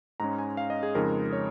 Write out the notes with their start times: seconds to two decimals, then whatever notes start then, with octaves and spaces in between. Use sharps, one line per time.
0.20 G#2 G#3 C#4 A#5
0.38 G#5
0.57 F5
0.70 D#5
0.83 G#4
0.95 F2 C#3 G#3 D#4 A#4
1.33 C#5